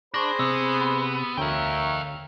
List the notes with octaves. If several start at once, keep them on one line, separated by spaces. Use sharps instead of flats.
D4 G#4 C5 B5 C#6 A#6
C3 B3 E6
D2 A#4 C#5 E5 F5 G5